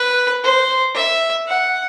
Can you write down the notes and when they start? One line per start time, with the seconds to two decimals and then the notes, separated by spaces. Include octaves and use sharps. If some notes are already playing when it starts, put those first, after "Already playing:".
Already playing: B4
0.43 C5
0.95 E5
1.48 F#5